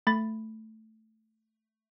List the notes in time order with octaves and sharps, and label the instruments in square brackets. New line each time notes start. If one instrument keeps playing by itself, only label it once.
[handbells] A3 B5 A6